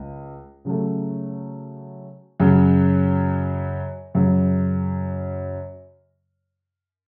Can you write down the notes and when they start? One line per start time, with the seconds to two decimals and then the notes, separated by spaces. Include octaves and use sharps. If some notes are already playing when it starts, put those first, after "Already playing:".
Already playing: C#2
0.65 C#3 F#3 A3
2.40 F#2 C#3 F#3
4.14 F#2 C#3 F#3